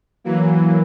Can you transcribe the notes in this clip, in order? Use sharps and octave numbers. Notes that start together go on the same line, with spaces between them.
E3 F#3 A#3